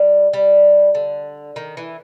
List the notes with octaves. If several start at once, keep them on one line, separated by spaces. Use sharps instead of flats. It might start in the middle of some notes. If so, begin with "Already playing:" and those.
Already playing: G3
G3
D3
D#3
E3